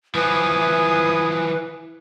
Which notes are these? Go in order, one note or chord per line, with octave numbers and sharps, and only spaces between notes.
E3 F3 E4 B4 G#5 D#6